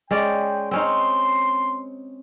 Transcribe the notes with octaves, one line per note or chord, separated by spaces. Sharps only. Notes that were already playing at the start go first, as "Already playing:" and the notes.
G#3 C#4 D5 G5
C4 C#4 D#4 C6